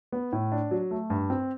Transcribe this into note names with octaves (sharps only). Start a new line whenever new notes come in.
B3
A2
D4
F#3
A3
G2
C4